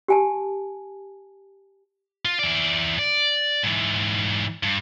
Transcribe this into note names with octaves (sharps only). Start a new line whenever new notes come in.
G4 G#5 A5
F4
E3 D5
D5
G#2 E3
G2